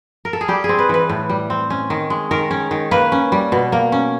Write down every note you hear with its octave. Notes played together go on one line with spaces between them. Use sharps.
A#4
A4
G#4
G3 G4
G#4
C4
B4
E3 B4
A2
G3
C4
C#4
D#3
G#3
D#3 A#4
C#4
D#3
A#3 B4
C#4
G3
B2
A#3
C#4